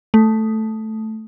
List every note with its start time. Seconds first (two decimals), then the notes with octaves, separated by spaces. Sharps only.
0.14 A3